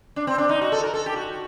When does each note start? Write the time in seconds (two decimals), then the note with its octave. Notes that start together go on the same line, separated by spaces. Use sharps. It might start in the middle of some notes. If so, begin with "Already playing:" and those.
0.16 D4
0.27 C4
0.38 D4
0.49 D#4
0.61 F#4
0.72 A4
0.83 A#4
0.94 A4
1.06 G4
1.16 F#4